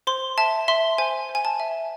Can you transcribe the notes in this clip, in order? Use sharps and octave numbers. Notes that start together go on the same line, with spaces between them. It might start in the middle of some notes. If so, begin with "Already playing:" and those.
C5 C6
E5 A5
E5 C6
C5 G#5
C5
G#5
A5
E5